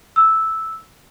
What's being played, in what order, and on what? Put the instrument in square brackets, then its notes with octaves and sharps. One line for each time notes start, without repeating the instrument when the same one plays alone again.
[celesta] E6